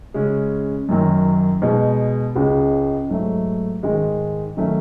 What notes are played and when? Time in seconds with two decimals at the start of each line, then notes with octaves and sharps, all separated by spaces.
0.14 C#3 G#3 C#4
0.89 F#2 D#3 F#3
1.62 B2 G#3 D#4
2.35 C#2 C#3 G#3
3.09 G#2 F#3 A3
3.83 G#2 D#3 G#3
4.57 D#3 F#3 A3 C#4